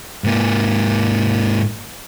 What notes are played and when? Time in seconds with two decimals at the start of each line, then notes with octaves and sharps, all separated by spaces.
0.24 G#2 A#3